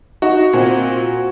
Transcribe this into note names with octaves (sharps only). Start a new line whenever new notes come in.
D#4 F#4
A#2 C4